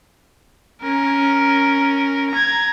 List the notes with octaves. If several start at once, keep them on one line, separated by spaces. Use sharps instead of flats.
C#4 A#4
A#5 G#6